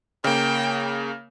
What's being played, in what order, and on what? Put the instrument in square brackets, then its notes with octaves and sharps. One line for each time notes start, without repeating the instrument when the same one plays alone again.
[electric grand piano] C#3 A#3 [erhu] G5